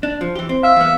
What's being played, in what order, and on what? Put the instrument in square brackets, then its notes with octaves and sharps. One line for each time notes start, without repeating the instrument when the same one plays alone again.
[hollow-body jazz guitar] D4
F3
E3 G4
C4
[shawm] E5 [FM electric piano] F5
[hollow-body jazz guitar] E2 B3